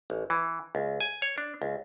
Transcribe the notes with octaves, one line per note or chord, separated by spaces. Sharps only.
A1
E3
C#2
G#5
C#5
D4
C#2